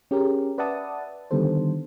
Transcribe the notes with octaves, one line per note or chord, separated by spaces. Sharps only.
C#4 G4 G#4 A#4
B4 D5 E5 F#5 A5 D#6
D3 D#3 G3 B3 A4 C5